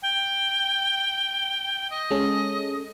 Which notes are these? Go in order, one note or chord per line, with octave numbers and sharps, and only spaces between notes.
G5
D#5
G#3 C#4 A4